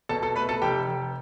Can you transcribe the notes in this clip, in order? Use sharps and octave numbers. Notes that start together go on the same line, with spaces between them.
B2 A4 A5
A4 A5
A3 B4 B5
A4 A5
F1 G4 G5
F1